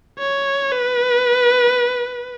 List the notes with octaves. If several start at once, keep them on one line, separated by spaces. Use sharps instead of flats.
C#5
B4